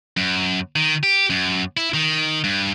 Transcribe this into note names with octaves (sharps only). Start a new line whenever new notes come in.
F#2
D#3
G4
F#2
E4
D#3
G2